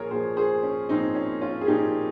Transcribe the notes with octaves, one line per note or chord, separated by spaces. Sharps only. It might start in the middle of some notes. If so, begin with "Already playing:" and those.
Already playing: A#2 F3 F4 G#4 A#4 C#5
A#2 F3 G#4 C5
G#4 C5
C#4
A#2 F3 C4 D#4
C#4
C#4 F4
G#4
A#2 F3 D#4 G4